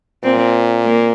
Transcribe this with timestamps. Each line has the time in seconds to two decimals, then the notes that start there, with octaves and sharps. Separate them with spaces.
0.24 A#2 C4
0.84 A#3